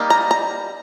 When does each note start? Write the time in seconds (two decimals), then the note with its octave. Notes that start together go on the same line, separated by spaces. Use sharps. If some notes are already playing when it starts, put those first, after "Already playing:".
Already playing: G3 A#3 D#4
0.10 A#5
0.31 A#5